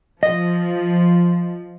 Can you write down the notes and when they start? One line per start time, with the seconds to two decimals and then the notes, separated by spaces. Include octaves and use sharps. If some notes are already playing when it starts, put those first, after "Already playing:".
0.23 F3 D#5